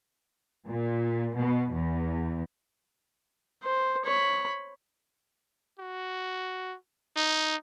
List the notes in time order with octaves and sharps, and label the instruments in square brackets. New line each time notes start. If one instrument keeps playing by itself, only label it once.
[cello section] A#2
B2
E2
[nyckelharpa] C5
C#5 B5
[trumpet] F#4
D#4